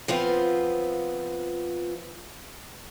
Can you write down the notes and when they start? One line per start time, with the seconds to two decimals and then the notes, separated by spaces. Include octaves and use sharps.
0.08 F3 B3 C4 F4